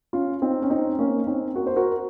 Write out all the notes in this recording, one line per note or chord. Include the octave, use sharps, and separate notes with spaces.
C#4 F4
C4 D#4
C#4
C4 D#4
A#3 C#4
C4 D#4
F#4 A#4
C5
F#4 A#4